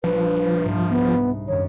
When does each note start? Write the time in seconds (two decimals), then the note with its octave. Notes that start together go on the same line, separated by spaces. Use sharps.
0.04 A#1 F3 G3 D4 B4
0.60 C2 G#2
0.90 B3
1.48 F#2 D#3 C#5